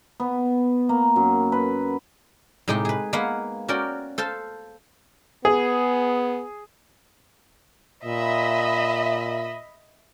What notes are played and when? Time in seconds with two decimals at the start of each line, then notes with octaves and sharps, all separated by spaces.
0.20 B3
0.89 A#3
1.16 F#2
1.52 B4
2.68 A2 C3 G#3 D#4 G4 G5
2.85 G#4 B4
3.13 G#3 A#3 B3 B4 F5 F#5
3.68 C#4 F#4 A#4 D5 G5
4.18 A4 C5 F5 A5
5.45 B3 G#4
8.05 A#2 D#5 E5 B5